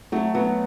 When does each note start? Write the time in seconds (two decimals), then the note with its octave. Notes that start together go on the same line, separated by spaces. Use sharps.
0.12 F#3 A3
0.35 F#3 B3